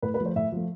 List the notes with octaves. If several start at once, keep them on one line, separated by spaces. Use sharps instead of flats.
A2 B4
B4
F3 A3
C5
A2 E5
F3 A3